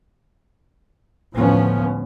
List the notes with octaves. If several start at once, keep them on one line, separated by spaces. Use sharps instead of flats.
D2 A2 F3 B3 C#4